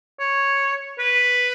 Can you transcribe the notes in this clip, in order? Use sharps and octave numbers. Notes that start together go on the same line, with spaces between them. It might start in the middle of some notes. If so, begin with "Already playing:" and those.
C#5
B4